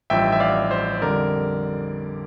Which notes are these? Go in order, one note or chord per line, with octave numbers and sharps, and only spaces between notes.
A1 G2 F3 E5 G5
E5
D5 F5
C5
F2 D3 G3 A#4 D5